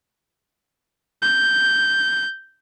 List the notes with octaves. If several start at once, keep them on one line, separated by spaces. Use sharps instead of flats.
G6